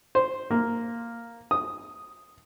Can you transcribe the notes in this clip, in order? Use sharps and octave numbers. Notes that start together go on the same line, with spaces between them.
C5
A#3
D#6